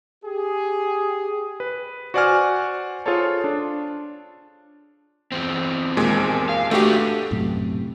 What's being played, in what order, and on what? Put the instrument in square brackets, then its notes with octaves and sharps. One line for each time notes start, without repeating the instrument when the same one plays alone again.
[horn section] G4 G#4
[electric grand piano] B4
F#4 C5 D5 F#5 G#5 F6
F4 G#4 A4 C5 C#5 A5
D4
[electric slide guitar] E2 C4
[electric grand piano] D#2 A#2 G#3
[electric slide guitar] F5
[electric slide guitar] D3 D4 B4 [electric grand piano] A3 F#4 G4
[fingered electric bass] A#1 F#2 A2 C3